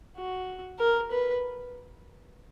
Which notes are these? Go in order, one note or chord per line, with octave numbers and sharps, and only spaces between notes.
F#4
A#4
B4